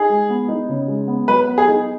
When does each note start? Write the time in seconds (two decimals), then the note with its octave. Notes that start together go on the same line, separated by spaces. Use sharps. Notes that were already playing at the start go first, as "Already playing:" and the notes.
Already playing: D#4 G#4
0.09 G#3
0.30 B3
0.48 D#4
0.69 C#3
0.88 G#3
1.07 B3
1.28 F#3 B4
1.48 B3
1.58 G#4
1.68 D#4